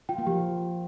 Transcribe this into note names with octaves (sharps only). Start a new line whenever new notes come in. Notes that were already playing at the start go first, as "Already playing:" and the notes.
F4 G5
A#3
F3 G4